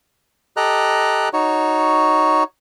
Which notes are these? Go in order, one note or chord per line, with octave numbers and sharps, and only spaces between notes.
G4 A4 D#5 A#5 F#6
D#4 F#4 C#5